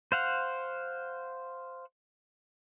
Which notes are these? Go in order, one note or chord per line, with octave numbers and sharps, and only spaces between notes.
C5 F5 F#5